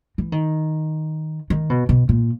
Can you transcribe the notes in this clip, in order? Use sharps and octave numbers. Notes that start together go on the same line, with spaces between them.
E3
D#3
D#3
B2
B2
A#2